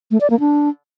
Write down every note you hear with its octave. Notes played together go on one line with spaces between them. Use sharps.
A3
D5
A#3
D4